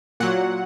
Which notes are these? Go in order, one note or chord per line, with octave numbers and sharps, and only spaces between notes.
A#2 F#3 F#5